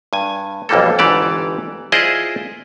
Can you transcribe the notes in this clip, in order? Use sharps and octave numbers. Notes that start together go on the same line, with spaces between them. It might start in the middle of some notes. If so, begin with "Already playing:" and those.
G2 G#5
B1 F2 E3 G3 A#3 A4
G1 G#2 E3 G4 D5 A5
E4 F4 G#4 C5 D5 D#5